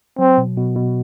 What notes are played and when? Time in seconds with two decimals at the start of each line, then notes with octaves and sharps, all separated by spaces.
0.18 F#3 C4
0.38 B2
0.57 B2
0.76 B2